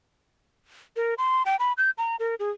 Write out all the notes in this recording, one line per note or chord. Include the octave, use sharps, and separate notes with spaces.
A#4
C6
G5
B5
G6
A#5
A#4
G#4